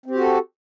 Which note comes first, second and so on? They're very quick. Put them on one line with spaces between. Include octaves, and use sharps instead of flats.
C4 G4 F#4 A4